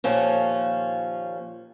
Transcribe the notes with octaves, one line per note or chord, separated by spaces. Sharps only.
D#2 A#2 F3 C#4